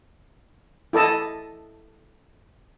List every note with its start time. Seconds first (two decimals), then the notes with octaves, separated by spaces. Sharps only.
0.93 E4 A4 D#5 A5